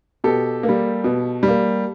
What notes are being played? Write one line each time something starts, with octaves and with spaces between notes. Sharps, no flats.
B2 G4 A4
A#3
G3
B2
G3
A#3